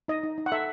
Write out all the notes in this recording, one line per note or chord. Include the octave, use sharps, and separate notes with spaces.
D#4 D#5
D#4
D#4
F#5
A4 E5